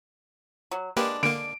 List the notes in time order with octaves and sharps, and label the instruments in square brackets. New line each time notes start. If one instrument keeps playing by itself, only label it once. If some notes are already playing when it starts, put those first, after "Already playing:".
[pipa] F#3
[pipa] G#3 D4 [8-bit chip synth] A#3 G4 B4
[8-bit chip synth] D3 A#3 [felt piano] D7